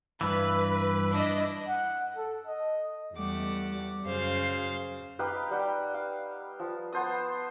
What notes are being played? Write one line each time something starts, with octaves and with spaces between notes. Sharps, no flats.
G2 E3 B4
D4 E4 D#5
F#5
A4
D#5
E2 G3 A3 F#5 D6
F#2 C#3 C5 F5
D#4 G4 B4 F5
G3 F#5 G5
F5
F3
B3 C5 A5 D#6